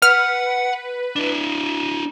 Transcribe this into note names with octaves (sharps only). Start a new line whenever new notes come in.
B4 F#5 F6
D4 E4